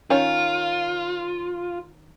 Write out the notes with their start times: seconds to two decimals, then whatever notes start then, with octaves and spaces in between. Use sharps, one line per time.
0.10 D#3 C#4 F4